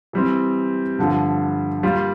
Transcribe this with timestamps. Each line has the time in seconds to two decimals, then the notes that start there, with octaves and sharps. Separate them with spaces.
0.13 E3 G3 C4
0.98 G2 D3 F3
1.83 G3 A#3 F4 A#4